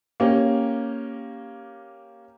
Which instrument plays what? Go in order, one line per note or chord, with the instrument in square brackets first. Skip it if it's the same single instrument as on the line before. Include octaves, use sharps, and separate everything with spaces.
[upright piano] A#3 C#4 G4